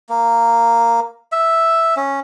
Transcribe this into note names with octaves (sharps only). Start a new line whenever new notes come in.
A#3
E5
C#4